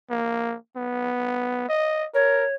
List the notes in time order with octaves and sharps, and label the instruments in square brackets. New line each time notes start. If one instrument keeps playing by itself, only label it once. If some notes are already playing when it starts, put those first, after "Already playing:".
[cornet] A#3
B3
D#5
[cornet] A#4 [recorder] C#5